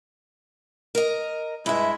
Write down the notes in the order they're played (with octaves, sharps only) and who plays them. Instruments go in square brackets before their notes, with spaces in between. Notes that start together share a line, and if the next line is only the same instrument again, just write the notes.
[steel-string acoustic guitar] A#4 D#5
[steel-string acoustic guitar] G2 E5 [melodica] G#3 E4